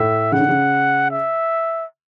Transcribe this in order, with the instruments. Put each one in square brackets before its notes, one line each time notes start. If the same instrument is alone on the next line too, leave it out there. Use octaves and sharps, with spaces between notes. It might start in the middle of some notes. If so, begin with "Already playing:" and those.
Already playing: [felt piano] A2 [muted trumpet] E5
[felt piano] C#3 [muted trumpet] F#5
[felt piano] D3
C#3
[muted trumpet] E5